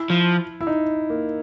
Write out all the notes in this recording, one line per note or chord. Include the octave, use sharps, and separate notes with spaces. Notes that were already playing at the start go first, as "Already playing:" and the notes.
Already playing: E4
F3
E4
D#4
A#3